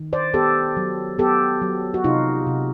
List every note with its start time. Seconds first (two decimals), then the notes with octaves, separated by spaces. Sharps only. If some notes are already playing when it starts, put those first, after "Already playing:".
Already playing: D#3
0.13 C5 D5
0.34 B3 G4 A4
0.77 F#3
1.18 B3 G4 A4
1.62 F#3
1.94 F#4
2.04 C3 D#4 F4
2.47 C3